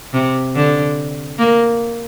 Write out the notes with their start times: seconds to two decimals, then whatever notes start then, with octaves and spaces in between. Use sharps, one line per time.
0.13 C3
0.55 D3
1.38 A#3